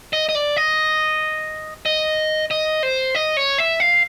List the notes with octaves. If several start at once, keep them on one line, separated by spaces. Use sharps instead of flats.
D#5
D#5
D5
D#5
D#5
D#5
C5
D#5
C#5
E5
F5